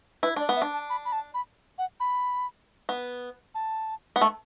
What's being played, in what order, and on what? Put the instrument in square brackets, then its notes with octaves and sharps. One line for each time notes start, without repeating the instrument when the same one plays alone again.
[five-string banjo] E4 [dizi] B4
[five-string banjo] D4 [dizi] D5
[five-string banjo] B3
[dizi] E5
[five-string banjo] D4
[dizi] A5
B5
B5
A5
B5
F#5
B5
[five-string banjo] B3
[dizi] A5
[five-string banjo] B3
A3